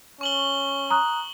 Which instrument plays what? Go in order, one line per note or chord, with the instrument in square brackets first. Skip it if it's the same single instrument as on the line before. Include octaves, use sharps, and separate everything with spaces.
[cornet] C#4 [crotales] C#6 F#7 G7
[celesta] A#5 D#6 F#6